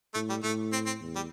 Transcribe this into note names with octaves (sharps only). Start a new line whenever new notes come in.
A2 A3
G3
A2 A3
C4
C4
E2
G3